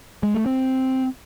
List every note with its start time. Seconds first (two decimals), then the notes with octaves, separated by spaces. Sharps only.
0.23 G#3
0.34 A3
0.46 C4